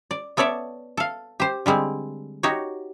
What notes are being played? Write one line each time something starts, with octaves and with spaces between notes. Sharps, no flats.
D5
B3 A4 C#5 D5 E5
A4 F5
G4 C5
D3 G3 G#3 C4
D#4 F#4 G4 C#5